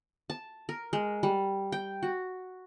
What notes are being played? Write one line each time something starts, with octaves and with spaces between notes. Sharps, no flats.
A5
A#4
G#3
G3
G5
F#4